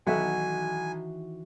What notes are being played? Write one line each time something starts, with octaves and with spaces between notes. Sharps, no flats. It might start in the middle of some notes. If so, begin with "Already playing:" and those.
B1 D#3 E3 F#4 E5 G#5